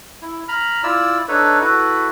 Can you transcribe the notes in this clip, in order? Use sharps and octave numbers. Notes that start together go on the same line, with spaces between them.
E4
A#5 B5 F6
E4 F4 D5 E6
D4 D#4 A4 B4 C#5
E4 F#4 A4 B4